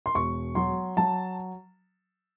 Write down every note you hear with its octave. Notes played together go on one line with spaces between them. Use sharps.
C6
E1 C#6
F#3 C6
F#3 A5